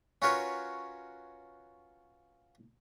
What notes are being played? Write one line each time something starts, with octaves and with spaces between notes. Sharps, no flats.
C#4 F4 F#4 A#4 B4 C#5